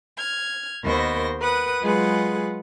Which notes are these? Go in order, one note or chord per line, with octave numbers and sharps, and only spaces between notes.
F6 G#6
D#2 B3 A#4 C5 C#6 A#6
A#4 B4 F#5 D#6
F#3 G#3 F4 G#4 B4 F#5